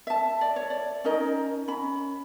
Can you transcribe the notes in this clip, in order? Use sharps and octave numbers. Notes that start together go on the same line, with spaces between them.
E5 A5
D5
C#5
D5
C#4 D#4 A#4 D#5
C#4 B5